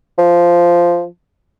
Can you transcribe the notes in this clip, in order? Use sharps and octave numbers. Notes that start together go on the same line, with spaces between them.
F3